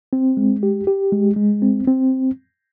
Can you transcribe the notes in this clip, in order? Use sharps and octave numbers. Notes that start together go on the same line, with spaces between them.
C4
G#3
G4
G4
G#3
G#3
C4
C4